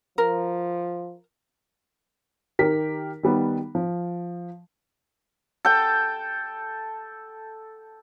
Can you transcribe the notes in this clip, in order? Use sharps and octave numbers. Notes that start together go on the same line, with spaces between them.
F3 A#4
D#3 G4 A#4 B6
D#3 G3 B3
F3
A4 G5